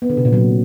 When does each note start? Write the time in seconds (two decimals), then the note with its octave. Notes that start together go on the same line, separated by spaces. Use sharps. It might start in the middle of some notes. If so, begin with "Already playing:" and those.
0.02 B3
0.10 D3
0.17 C3
0.25 A#2
0.33 F#3